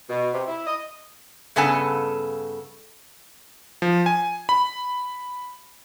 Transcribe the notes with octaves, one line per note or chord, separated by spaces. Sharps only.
B2
C3
E4
D#5
G2 C#3 B3 A4 G#5 A5
F3
G#5
B5